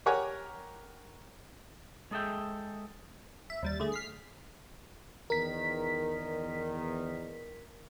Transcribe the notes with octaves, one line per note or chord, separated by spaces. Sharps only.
G4 A#4 C#5 F#5 G#5
G#3 G#4 A4 E5 G5
E5
D#2 G3 A6
D3 A3 G#4
F6 B6 C7
E2 D#3 A#4 B6